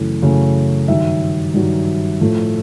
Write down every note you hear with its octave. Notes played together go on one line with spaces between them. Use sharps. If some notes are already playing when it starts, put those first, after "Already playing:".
Already playing: F#2 C#3 E3 A3
F#2 C#3 E3 A3
G2 D#3 F#3 E5
G2 D#3 F#3
A2 F3 A3